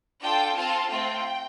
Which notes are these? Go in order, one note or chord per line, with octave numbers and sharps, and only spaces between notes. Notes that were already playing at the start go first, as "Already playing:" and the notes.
D4 F4 A4 G5
C4 F4 A4 A5
A3 C4 F4 G5